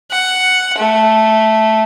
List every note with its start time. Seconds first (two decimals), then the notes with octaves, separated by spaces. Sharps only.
0.11 F#5
0.78 A3